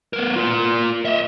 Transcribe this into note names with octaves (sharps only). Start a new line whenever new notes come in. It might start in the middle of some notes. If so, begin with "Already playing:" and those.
B3 A#4
F4 A#4
D#5 E5